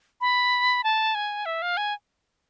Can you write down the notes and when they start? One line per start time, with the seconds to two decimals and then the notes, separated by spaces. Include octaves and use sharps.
0.21 B5
0.84 A5
1.15 G#5
1.45 E5
1.62 F5
1.77 G#5